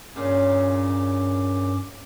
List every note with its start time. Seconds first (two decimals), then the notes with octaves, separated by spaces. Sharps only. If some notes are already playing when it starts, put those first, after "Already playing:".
0.16 G2 A#2 C#3 C#4 D6